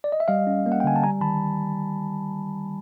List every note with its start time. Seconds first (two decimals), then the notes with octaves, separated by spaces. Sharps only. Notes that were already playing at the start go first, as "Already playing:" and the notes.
0.04 D5
0.12 D#5
0.20 E5
0.28 G3 D#5 F5
0.47 C#4
0.66 A#3
0.72 F#5
0.80 G5
0.84 D3 G#5
0.96 A5
1.03 G3 G#5 A#5
1.21 D#3 A5 B5